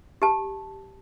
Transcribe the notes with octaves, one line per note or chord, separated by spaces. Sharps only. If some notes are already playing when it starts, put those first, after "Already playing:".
G4 A5